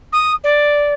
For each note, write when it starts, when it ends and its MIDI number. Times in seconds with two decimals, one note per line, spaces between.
0.13 0.32 87
0.44 0.94 74